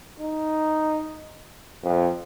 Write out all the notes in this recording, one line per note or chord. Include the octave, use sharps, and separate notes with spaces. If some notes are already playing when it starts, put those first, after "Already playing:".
D#4
F2